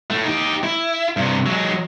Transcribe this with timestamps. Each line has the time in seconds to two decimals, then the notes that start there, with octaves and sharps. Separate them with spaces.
0.11 A2 A3
0.25 D#4 G4
0.64 E4
1.17 G2 C3
1.46 F#3 G#3